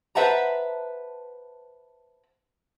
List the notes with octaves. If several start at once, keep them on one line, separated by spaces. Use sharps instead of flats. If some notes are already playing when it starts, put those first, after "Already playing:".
B4 C5 E5 F#5 A5 A#5